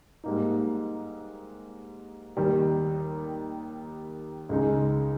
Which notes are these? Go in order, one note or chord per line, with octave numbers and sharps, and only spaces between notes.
G#2 G3 A#3 D#4
D#2 D#3 G3
C#2 C#3 G#3 D#4